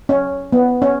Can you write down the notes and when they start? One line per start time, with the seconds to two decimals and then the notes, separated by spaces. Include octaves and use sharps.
0.09 C#4
0.52 B3
0.82 C#4